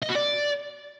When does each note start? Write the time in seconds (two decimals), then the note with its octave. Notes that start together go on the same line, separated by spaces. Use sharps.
0.02 D#5
0.09 F#4
0.15 D5